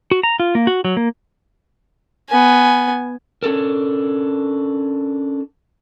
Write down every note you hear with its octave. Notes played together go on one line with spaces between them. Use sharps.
F#4
A#5
F4
A#3
F#4
F#3
A#3
B3 G#5
C#4 D4 A4 A#4